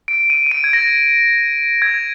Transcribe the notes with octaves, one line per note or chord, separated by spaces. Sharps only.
D7
D#7
D#7
D7
G#6
A#6
G#6